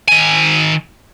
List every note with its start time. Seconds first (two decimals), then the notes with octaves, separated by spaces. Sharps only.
0.08 D#3 G#5